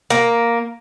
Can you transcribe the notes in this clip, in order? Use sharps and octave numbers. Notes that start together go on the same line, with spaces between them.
A#3